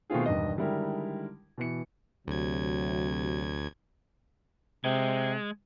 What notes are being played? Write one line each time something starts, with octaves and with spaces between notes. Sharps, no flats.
B2 D#3 A3 C4 F4 G#4
E1 G2 D#3 D#5
D3 D#3 G3 G#3 E4 A#4
B2 E3 C#7
D2 C3 F#3 G#6
C3 G#3